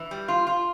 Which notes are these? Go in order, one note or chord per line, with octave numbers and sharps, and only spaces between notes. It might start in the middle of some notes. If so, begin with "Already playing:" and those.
Already playing: E3
G3
F4
F4